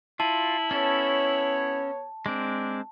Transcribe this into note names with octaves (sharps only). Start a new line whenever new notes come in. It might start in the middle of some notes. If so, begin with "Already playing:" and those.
E4 F4 A5
B3 C#4 A4 C#5
G#3 C4 D4